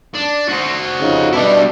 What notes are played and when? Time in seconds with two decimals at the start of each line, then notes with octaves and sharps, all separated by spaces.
0.15 D4
0.49 F#4 C5
1.00 F2 C#3 D#4
1.33 B2 G3 D4 E4